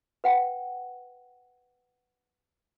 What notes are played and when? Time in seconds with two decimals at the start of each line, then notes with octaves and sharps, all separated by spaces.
0.24 B4 F#5 G5